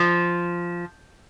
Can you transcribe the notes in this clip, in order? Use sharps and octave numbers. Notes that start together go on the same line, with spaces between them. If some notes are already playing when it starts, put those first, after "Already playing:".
Already playing: F3